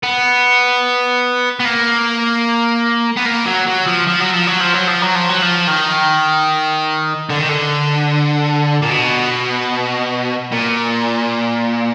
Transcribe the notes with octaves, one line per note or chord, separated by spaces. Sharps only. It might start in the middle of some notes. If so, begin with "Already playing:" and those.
B3
B3
A#3
B3
A#3
F#3
F#3
F3
F3
F#3
F3
F#3
F3
F#3
F3
F#3
F3
F#3
F3
D#3
D3
D#3
D3
A#2
B2
A#2